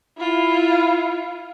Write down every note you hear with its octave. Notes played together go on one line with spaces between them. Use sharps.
E4 F4